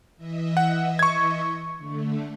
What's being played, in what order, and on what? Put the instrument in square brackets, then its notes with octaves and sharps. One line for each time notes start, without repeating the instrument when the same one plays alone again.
[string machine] E3 D#5 E5
[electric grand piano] F#5
C#6 G#6
[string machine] D3 A3